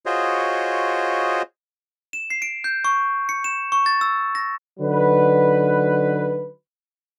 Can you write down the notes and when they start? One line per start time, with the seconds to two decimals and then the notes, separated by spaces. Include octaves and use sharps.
0.06 F4 F#4 G#4 C5 C#5 D#5
2.13 E7
2.30 C7
2.42 D7
2.64 G6
2.85 C#6
3.29 C#7
3.44 E7
3.72 C#6
3.86 A6
4.01 E6
4.35 A#6
4.80 D3 F#3 D#4 B4